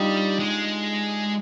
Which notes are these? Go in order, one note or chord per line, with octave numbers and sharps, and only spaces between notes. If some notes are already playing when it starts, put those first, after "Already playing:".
Already playing: G3 D4 D#4 F4 G4
G#3